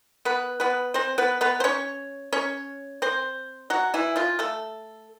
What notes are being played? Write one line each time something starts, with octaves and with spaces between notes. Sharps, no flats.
B3 B4
B3 B4
C4 C5
B3 B4
B3 B4
C5
C#4 C#5
C#4 C#5
C4 C5
F#3 F#4
E3 E4
F3 F4
A3 A4